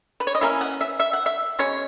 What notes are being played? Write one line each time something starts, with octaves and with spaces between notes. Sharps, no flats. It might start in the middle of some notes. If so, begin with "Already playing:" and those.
B4
C#5
D#5
E3 A#3 C#4 E4 E5
F#5
E5
E5
F#5
E5
B2 G#3 C#4 C#5